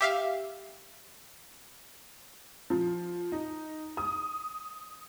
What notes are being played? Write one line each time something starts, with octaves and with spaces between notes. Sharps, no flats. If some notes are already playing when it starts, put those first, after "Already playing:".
G4 E5 F5
F3
D#4
D#6